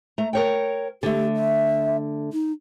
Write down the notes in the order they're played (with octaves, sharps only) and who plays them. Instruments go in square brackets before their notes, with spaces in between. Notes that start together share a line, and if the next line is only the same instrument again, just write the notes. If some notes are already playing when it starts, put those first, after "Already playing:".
[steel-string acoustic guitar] A3 A#5
A#4 C#5 G5
[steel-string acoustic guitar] D3 A3 [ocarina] G4
[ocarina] E5
D#4